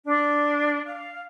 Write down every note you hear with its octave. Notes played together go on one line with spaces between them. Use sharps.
D4
F5